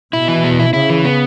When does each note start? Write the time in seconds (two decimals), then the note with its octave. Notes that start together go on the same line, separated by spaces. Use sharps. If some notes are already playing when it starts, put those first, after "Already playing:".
0.13 B2 E4
0.28 E3
0.44 B3
0.60 E4
0.73 C#3 E4
0.90 E3
1.05 B3